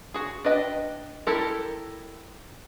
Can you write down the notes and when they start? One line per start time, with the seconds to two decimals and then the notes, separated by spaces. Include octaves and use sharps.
0.14 F#4 G#4
0.45 D4 B4 D#5 F5 G5
1.27 E4 G4 A4 A#4